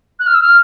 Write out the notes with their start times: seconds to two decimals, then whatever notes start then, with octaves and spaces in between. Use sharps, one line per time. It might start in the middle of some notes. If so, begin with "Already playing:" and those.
0.19 F#6
0.27 F6
0.35 E6
0.42 F6